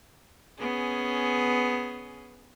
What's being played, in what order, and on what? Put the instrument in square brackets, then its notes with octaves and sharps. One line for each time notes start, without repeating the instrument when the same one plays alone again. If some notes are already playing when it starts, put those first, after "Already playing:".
[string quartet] B3 C#4 G#4